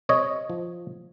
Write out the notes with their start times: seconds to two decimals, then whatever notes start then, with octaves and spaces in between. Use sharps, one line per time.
0.09 C3 C#5 D#5
0.50 F3